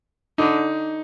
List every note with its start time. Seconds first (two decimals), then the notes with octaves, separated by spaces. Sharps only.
0.38 D3 D#4